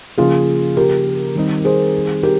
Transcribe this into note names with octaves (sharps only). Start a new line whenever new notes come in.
C#3 F3 A#3 C#4 F4 G#4
G4 A#4
D#3 G3 C4 D#4
G#4 C5
G4 A#4